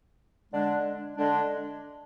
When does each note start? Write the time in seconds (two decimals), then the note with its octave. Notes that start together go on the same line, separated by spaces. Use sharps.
0.52 D3 G#3 D4
1.17 D3 G#3 D4